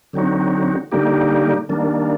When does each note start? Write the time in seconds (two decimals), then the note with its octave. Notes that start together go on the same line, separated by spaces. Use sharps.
0.13 D3 F#3 C4 D#4 F#4
0.92 D3 G3 A#3 D#4 G4
1.69 D#3 G3 A#3 D4